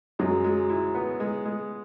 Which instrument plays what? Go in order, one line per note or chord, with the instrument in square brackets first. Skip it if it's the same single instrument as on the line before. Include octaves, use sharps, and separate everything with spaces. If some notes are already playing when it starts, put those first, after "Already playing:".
[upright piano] F#2 F#3 [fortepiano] G#3
[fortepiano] G#3
E4
B3
G#3
G#3